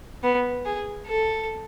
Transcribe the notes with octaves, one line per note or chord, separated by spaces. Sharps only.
B3
G#4
A4